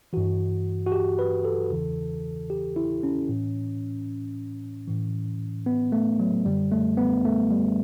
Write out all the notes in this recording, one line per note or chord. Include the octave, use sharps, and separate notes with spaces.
G2 E3 F#4
F#4
G4
B4
A4
E2 C#3 E3
G4
E4
C#4
A2 E3
A2 E3
B3
A3
F#3
F#2 D3 G3
A3
B3
A3
G3